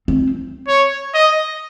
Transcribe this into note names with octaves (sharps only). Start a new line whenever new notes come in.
C4
C#5
D#5